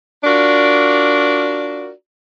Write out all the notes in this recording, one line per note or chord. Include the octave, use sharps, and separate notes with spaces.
D4 F4 F#4 A#4 D5